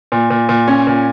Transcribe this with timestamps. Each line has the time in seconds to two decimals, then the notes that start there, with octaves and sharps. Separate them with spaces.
0.12 A#2
0.30 A#2
0.49 A#2
0.68 C#4
0.87 A#2